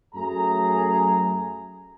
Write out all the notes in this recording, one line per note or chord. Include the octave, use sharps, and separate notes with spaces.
F#2 F#3 A3 G#4 A#5